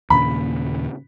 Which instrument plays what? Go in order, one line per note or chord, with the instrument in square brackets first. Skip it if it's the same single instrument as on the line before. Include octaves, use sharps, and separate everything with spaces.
[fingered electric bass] D#2 A#2 C#3 [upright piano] B5